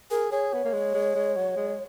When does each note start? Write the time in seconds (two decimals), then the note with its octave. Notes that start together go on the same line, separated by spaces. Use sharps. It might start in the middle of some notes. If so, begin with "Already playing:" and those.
0.11 G#4 A#4
0.31 G#4 C#5
0.53 B3
0.65 A#3
0.73 G#3
0.94 G#3
1.15 G#3
1.36 F#3
1.56 G#3